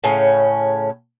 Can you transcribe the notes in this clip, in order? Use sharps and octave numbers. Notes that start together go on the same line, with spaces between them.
A2 C#3 C#4